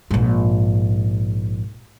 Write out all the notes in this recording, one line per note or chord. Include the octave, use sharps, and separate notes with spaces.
A#1 G#2